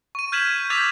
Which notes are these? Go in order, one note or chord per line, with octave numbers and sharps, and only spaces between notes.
C#6 D#7
F6 G6 G#6 B6 E7 F#7
D6 E6 G6 A6 B6 F7